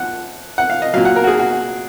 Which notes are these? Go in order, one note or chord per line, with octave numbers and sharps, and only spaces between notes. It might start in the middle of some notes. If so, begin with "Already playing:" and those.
Already playing: F3 F#5
F#5
F5
D#5
A#2 F#3 F5
F#5
A#4
F#4
G#4
F#4
F#4